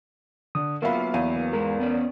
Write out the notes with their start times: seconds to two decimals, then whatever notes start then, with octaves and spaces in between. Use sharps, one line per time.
0.55 D3 D#6
0.82 F#3 A#3 B3 F4 A#4 E5 F5 B5
1.14 E2 F5 D#7
1.53 G#2 G#3 B3 A#4
1.80 B3 C#4 D5